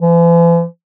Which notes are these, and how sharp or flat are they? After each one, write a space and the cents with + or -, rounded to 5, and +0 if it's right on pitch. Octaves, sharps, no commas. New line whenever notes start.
E3 +45